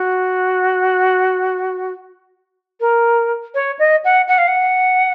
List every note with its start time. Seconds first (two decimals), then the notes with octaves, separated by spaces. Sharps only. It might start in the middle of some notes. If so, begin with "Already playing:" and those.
Already playing: F#4
2.80 A#4
3.55 C#5
3.79 D#5
4.04 F#5
4.28 F#5
4.38 F5
4.48 F#5